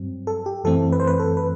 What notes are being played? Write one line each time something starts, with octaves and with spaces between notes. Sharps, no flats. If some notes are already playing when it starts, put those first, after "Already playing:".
Already playing: G2 F#3 C4
A4
G4
F#2 E3 A3 C4 A4
B4
C5
B4
A4
B4